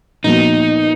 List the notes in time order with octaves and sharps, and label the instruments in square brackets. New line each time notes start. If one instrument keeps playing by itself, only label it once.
[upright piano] A#2 F3 B3 F#4 [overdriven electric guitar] D#4